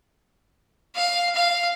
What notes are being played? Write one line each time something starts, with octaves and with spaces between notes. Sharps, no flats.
F5
F5